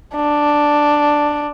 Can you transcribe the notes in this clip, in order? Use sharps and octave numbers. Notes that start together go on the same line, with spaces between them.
D4